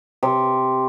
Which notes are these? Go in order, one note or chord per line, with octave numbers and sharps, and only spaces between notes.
C3